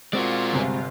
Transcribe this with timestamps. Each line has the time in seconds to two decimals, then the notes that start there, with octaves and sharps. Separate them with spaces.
0.13 G#3 C4 F4 F#4 A#4 D5
0.53 G1 C3 G#5